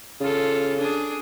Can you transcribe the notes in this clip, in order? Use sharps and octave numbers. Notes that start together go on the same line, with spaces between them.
C#3 F4 A4
D4 G#4